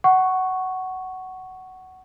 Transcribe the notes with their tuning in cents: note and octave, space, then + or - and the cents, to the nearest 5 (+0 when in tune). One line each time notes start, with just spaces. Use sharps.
F#5 +15 C#6 +0